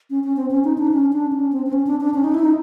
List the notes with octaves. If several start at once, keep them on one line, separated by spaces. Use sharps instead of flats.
C#4
C#4
C4
C#4
D#4
D4
C#4
D4
C#4
C4
C4
C#4
D4
D4
C#4
D#4
E4
D#4